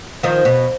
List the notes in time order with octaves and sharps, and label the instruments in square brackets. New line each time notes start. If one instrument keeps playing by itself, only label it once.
[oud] D#3 F3
B2